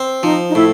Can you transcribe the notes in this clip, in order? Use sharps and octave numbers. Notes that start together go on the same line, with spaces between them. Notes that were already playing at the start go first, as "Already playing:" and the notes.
Already playing: C4
F3 D#4
D#4
A2 E4